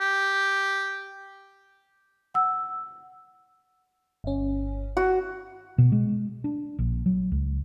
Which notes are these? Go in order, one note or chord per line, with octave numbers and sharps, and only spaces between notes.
G4
F#5 E6
G1 C#4
F#4
B2
G#3
D4
A#1
F#3
C#2